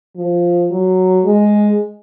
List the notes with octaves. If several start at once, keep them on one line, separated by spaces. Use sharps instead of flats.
F3
F#3
G#3